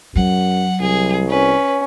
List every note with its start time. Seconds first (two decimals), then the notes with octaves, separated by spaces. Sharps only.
0.16 F#2 F#3 F#5
0.81 C2 G#4
1.29 C#4 B4